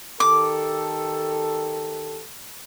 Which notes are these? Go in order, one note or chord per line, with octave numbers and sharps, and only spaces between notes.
D#3 G4 A4 D6